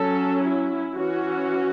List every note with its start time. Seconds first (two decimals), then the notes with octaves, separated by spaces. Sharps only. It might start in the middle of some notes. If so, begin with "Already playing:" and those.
Already playing: F#3 C#4 A4
0.43 E4
0.98 E3 C#4 F#4